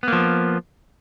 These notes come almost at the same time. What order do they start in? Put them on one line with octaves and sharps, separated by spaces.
B3 A#3 F3